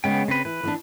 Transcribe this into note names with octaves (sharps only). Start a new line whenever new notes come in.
C#3 G#3 B3 C#4 G5
C#3 C4 B4 C5
E3 B4
E3 B3 D4